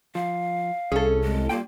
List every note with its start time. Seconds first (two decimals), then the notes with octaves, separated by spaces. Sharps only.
0.15 F3 F5
0.92 C2 C#4 G#4 A4 E5
1.24 G#3
1.49 G2 A#3 F4 G5